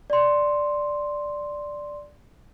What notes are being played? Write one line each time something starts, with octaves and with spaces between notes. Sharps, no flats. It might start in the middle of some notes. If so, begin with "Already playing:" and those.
D5 C6